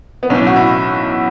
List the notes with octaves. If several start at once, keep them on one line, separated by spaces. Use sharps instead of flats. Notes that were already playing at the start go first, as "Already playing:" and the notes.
B3
B1 A2 E3 C#4
F#4
E4